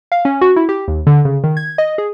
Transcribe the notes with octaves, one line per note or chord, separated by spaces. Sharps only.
F5
C#4
F#4
E4
G4
D#2
D3
C#3
D#3
G#6
D#5
G#4